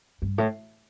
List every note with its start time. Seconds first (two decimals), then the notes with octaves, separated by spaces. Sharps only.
0.22 G2
0.38 A2